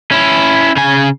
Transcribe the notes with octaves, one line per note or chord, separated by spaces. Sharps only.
C#4 E4
C#3 G#5